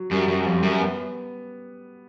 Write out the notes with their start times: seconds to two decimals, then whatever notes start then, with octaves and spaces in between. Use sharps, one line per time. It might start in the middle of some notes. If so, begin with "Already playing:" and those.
Already playing: F#3
0.11 F#2 G3
0.28 F#2
0.34 G3
0.46 F2
0.57 G3
0.63 F#2
0.80 B3